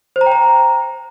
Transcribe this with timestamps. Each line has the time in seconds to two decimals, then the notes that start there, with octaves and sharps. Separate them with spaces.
0.16 C5
0.21 A#5
0.26 G5
0.32 A#5